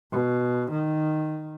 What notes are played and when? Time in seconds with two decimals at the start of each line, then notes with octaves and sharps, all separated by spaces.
0.12 B2
0.71 D#3